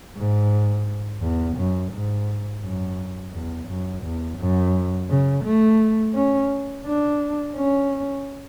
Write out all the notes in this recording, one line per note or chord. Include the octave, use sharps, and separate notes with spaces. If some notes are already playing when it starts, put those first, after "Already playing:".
G#2
E2
F#2
G#2
F#2
E2
F#2
E2
F#2
C#3
A3
C#4
D4
C#4